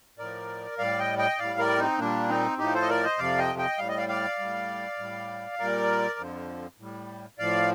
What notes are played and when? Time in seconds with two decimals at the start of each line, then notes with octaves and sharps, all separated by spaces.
0.18 A2 F3 A#4 D5
0.78 A2 G3 D5 F5
0.99 D#5 G5
1.18 D#5 G5
1.38 A2 G3 D5 F5
1.59 A#4 D5
1.79 C4 D#4
1.98 A#2 G3 A#3 D4
2.28 C4 D#4
2.58 A2 F3 D#4 G4
2.74 A4 C5
2.82 D#5
2.89 A#4 D5
3.04 C5 D#5
3.18 F2 C3 F3 D5 F5
3.38 D#5 G5
3.58 D#5 G5
3.78 A2 G3 F5
3.89 D#5
3.97 D5 F5
4.08 D5 F5
4.39 A2 G3
4.98 A2 G3
5.59 A#2 G3 A#4 D5
6.19 F2 D3 F3
6.79 A2 G3
7.39 A2 F3 D5 F5